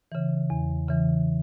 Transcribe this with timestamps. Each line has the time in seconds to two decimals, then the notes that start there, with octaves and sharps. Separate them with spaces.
0.12 C#3 E3
0.50 E2
0.89 C#3 E3